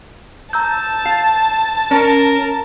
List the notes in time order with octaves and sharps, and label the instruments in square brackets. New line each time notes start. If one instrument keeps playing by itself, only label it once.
[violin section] A5 [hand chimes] A#5 E6 G6
[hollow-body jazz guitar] F5
[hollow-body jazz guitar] C#4 [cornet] A#4